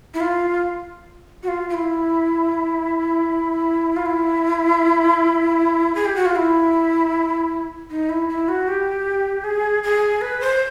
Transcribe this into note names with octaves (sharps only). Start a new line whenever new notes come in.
E4
F4
F#4
F4
F4
E4
F4
E4
G#4
G4
F#4
F4
E4
D#4
E4
E4
F#4
G4
G#4
G#4
B4
C5